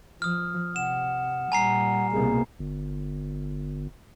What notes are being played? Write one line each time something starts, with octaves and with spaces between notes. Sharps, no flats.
F3 D#6 F6
C3 F#5 E7
A#2 G3 G#5 A#5 C7
C2 B2 A#3 G#4
G1